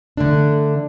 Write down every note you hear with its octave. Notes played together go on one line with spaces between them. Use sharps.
D3 A3 D4